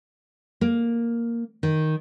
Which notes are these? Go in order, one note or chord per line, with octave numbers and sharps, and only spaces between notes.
A#3
D#3